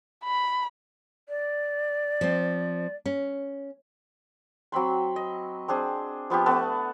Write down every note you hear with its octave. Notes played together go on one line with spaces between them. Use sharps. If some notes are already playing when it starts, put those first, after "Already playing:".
B5
D5
F3 C4
C#4
F#3 C4 B5 C6
D#5
C4 D4 G#4 C5
F3 B3 F4 G4
A3 B3 F#5 A5